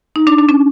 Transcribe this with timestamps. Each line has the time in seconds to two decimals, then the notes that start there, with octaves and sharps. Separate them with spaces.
0.16 D#4
0.27 D4
0.38 D4
0.49 C#4